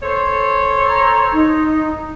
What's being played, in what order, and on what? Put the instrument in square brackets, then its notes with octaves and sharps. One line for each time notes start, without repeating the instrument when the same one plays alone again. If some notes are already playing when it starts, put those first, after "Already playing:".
[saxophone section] A4 C5 C#5
[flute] A#5
D#4